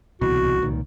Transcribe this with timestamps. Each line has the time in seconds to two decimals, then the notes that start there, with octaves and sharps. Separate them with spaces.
0.21 D1 C2 B2 E3 F#4
0.62 C#2 A#2 D#3